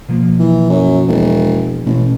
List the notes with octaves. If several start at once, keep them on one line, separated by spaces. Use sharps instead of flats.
B2 F3 A#3
E3
F#2
E1
A1 B2